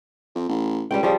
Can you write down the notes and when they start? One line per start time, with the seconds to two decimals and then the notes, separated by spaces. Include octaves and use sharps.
0.35 F2
0.49 A1
0.91 C#2 G3 G5
1.03 C#3 F3 G3